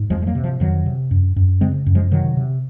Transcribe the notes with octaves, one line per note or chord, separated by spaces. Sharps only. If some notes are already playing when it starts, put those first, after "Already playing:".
Already playing: G#2
F2 F3 G#3
G#3
F#3 A#3
C3
F3
F2 D#3 F#3
C3
F#2
F#2
C#3 G#3 C4
F#2
F3 G#3
C3 D#3 F#3
C3